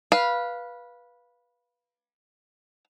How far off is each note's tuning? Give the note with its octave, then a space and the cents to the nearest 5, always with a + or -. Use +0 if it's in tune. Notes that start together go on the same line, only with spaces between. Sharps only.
B4 -15 F5 +0